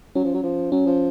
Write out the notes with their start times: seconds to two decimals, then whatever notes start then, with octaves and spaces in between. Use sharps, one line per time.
0.15 F#3 C#4
0.24 F3
0.34 F#3
0.43 F3
0.72 F#3 C#4
0.86 F3